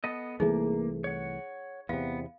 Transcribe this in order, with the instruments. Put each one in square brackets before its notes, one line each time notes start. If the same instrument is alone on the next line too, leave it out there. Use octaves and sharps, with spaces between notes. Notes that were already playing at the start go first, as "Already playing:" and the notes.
[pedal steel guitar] B3 A4 D#5
[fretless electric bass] C2 E3 A3 [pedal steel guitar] A#3 [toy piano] D#4 G#4
[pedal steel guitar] C#5 F#5
[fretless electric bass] E2 C3 [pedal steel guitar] B3 [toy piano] F5